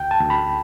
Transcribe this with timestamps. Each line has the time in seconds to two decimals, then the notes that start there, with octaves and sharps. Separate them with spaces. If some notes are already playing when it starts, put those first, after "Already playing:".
Already playing: D2 G5
0.11 A5
0.20 D2
0.30 B5